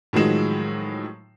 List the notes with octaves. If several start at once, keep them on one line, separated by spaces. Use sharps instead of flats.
A2 D#3 F3 F#3 G#3 E7